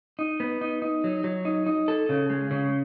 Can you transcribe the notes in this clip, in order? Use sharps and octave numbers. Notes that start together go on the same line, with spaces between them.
D#4
B3
D#4
D#4
F#3
F#3
D#4
D#4
A4
C#3
G#3
C#3